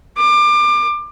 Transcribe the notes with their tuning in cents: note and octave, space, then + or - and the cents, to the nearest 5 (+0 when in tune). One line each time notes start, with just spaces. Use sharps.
D6 +25